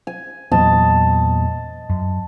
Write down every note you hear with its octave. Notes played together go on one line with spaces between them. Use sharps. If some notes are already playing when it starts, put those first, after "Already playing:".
G#5
E2 A#2 F#3 D#5 A5
F#2